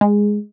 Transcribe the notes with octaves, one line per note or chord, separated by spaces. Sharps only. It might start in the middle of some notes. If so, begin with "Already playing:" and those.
G#3